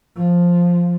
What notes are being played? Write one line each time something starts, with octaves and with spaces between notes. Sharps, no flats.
F3